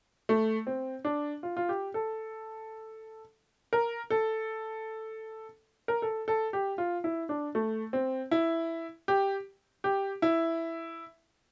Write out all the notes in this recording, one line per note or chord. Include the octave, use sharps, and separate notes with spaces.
A3
C4
D4
F4
F4
G4
A4
A#4
A4
A#4
A4
A4
G4
F4
E4
D4
A3
C4
E4
G4
G4
E4